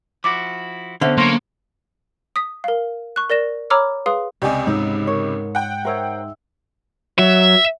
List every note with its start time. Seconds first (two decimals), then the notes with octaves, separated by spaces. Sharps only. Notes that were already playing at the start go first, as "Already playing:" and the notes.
0.24 F3 E4 F#4 D6
1.01 D3 B3 C#4 C5 E5
1.18 F#3 A#3 C#4 A#4 C#5 C6
2.36 D#6 B6
2.64 A#4 F5
3.16 C#6 F#6
3.30 A#4 D5 A#6 E7
3.70 C#5 A#5 B5 D6 E6 F6
4.06 G#4 B4 F5 C6 D#6
4.42 C#2 C3 G4 D5 D#5 G#5 C#6
4.67 G#2 D#4 C#5 E6
5.07 A#4 C#5
5.55 F#5 G5 F#6
5.85 A#4 C5 C#5 E5 E6
7.19 F#3 E5